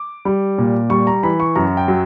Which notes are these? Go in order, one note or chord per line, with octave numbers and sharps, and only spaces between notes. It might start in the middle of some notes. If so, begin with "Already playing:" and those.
Already playing: D6
G3
A#2
G3 C#6
A#5
E3 B5
C#6
F#2 A#5
G5
F#3